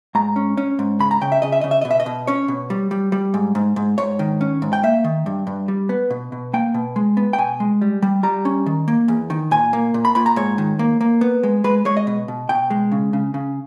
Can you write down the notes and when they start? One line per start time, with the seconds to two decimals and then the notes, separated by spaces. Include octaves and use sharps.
0.15 G#2 A#5
0.36 C#4
0.57 C#4
0.79 G#2
0.99 C#3 B5
1.11 A#5
1.21 C#3 G5
1.32 E5
1.42 C#3 D#5
1.52 E5
1.61 C#3 D#5
1.71 E5
1.81 B2 D#5
1.91 E5
2.00 D#5
2.06 B2
2.27 C#4 C#5
2.48 B2
2.70 G3
2.91 G3
3.12 G3
3.34 G#2
3.55 G#2
3.76 G#2
3.98 G#2 C#5
4.19 D#3
4.41 C#4
4.62 G#2
4.73 G5
4.83 A#3 E5
5.04 D#3
5.26 G2
5.47 G2
5.68 G3
5.89 B3
6.10 B2
6.32 B2
6.53 A#3 G5
6.74 B2
6.96 G#3
7.17 B3
7.33 G5
7.38 B2 G#5
7.60 G#3
7.81 G3
8.02 G3
8.23 G3 A#5
8.45 C#4
8.66 D#3
8.88 A#3
9.08 E2
9.30 D#3
9.51 A#2 G#5
9.73 A#3
9.94 A#2
10.05 B5
10.15 A#2 B5
10.26 A#5
10.36 G#2 C#5
10.58 D#3
10.79 A#3
11.01 A#3
11.21 B3
11.43 G#3
11.64 G#3 B4
11.85 G#3 C#5
11.97 D#5
12.07 B2
12.28 B2
12.49 B2 G5
12.70 G#3
12.92 C#3
13.13 C#3
13.34 C#3